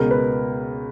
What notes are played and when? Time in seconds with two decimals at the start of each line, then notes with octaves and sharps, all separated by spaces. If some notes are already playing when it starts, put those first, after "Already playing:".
Already playing: C#2 B2 A#4
0.11 B4